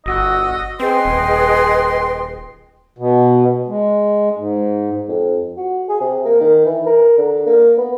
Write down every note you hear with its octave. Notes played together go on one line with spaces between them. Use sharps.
G1 F#4 D#5 E6
C4 G#4 B4 D#5 G5 C6
D#1
B2
G#3
G#2
F2
F#4
G#4
C3
A#3
D#3
E3
A#4
D3
A#3
B3